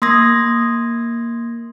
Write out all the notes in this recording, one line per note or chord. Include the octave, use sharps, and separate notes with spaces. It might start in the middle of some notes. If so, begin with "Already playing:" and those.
A#3 C6 D#6 G#6 A#6